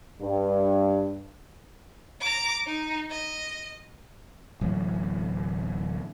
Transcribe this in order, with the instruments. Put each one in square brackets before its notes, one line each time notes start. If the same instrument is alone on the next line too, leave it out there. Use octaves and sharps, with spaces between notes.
[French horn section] G2
[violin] A#5 D6
D#4
D#5
[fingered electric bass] D1 E3 F#3 A3